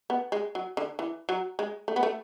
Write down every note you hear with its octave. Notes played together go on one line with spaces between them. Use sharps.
B3
G#3
F#3
D3
E3
F#3
G#3
A3
B3
A3